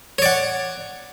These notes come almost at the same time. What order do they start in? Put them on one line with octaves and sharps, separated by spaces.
C#5 D5 F#5